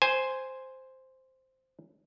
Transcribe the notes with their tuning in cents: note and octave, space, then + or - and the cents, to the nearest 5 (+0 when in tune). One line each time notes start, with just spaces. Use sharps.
C5 +0 G#5 +0